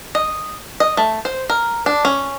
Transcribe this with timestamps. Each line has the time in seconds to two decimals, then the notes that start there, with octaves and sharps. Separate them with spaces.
0.15 D#5
0.80 D#5
0.97 A3
1.25 C5
1.50 A#4
1.86 D4
2.05 C#4